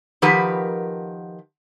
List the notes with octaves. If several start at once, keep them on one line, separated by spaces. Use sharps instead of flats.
D#3 F3 G4 A#4 B4 F#5